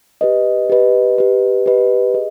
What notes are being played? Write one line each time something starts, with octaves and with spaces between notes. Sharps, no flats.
G4 B4 D#5
G4 B4 D#5
G4 B4 D#5
G4 B4 D#5
G#4 D#5